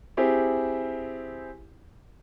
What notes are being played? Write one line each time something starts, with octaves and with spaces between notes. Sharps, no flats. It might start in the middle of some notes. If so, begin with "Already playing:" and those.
C4 E4 G4 G#4